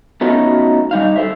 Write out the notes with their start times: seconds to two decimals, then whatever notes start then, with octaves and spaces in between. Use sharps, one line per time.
0.21 A3 B3 C#4 D#4 F4 F#4
0.91 G3 D#4 F5
1.16 A4 C5 E5